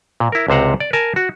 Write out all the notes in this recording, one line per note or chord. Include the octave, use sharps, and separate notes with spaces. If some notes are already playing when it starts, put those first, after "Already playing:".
A#2
E4 A#4
C#2 C3 C5 F#5 A#5
D5
A#4 G#5 A5
F#4